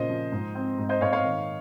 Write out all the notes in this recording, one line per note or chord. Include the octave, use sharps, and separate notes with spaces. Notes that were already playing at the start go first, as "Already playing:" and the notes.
Already playing: A#2 C#3 C5 D#5
F3
G#2
C4
G#2
C5 D#5
G#2 C#5 F5
C#5 F5
D#3